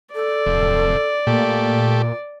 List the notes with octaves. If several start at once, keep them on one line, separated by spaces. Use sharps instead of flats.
A4 D5
D1 F2 C3
A#2 A3 A#3 G4